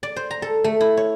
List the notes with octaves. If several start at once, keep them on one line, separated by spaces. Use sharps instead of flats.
D5
C5
A#5
A4
A3
E4
C#5